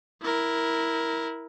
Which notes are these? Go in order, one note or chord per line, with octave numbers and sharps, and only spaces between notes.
E4 A#4